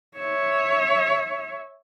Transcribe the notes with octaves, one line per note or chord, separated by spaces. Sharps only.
C#5 E5